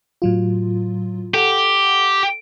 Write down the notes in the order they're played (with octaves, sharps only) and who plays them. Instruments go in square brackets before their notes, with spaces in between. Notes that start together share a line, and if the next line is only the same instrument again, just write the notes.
[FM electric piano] A2 F#3 F4
[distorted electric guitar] G4 [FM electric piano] A4 F#5